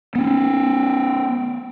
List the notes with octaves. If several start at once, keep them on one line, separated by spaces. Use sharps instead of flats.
B3 C#4